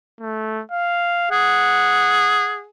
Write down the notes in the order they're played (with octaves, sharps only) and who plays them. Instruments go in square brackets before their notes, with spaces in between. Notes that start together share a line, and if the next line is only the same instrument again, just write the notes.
[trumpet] A3
F5
[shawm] G#4 [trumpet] F#5